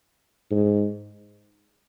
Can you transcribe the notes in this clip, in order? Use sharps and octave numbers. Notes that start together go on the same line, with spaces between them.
G#2